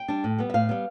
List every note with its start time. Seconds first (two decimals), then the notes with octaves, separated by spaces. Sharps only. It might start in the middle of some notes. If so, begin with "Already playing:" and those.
Already playing: G5
0.08 G3 D4
0.24 A2
0.38 G3 B3
0.50 E5
0.54 A2 F5
0.69 G3 B3